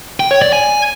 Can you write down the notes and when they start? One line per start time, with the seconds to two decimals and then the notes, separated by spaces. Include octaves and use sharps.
0.20 G5
0.31 C#5
0.42 D5
0.53 G#5